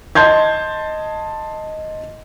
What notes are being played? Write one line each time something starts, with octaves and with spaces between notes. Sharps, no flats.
D#5 A5 C6 G6 G#6